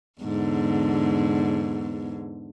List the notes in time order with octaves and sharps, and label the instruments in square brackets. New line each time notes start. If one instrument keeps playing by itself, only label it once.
[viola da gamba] E2 G#2 D3